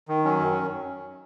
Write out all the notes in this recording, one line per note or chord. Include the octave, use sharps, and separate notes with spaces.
D#3
F#3 C#4
F#2